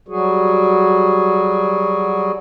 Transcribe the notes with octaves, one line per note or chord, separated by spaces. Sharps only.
F#3 G3 F#4 G#4